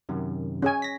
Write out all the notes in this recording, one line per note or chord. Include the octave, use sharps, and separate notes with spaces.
F#2 C3 D#3
C#4 G#4 G#5
A#6 B6